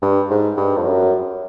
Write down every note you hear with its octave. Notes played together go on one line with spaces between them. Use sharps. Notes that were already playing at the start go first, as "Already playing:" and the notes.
G2
G#2
G2
F2
F#2